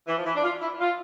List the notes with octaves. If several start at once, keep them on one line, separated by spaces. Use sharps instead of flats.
E3
F3
E3
D4
F4
E4
F4